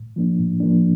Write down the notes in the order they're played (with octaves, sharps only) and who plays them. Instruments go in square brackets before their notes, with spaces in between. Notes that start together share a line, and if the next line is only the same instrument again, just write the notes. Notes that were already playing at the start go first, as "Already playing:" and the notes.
Already playing: [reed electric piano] A2
F3 A#3 D4
A2
F3 A#3 D4